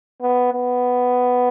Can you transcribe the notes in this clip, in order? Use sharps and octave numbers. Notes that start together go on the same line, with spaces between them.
B3
B3